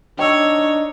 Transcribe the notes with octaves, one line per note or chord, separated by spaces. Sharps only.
D4 D#4 C#5 G5 E6